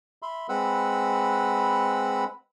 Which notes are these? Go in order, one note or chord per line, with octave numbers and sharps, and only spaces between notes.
E5 B5 C6
G#3 C4 B4 F#5 B5 E6